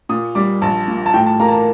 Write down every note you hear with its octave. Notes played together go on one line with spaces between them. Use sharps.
A#2 D#6
G3 D6
A#1 A5
A#2
A5
A2 G5
A5
A#3 A#5
A5
A#5